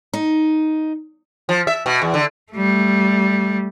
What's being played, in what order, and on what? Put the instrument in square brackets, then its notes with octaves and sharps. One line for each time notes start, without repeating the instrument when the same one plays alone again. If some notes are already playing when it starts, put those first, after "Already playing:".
[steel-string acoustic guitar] D#4
[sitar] F3
E5
B2
E2
D3
[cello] G3 A3